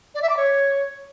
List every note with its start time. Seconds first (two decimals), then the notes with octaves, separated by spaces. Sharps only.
0.15 D5
0.22 E5
0.29 D6
0.37 C#5